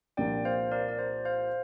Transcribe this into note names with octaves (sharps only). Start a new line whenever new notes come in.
C2 A#2 F3 A#3 D4 D5 G5
C5 F5
A#4 D5
D5
C5
C5 F5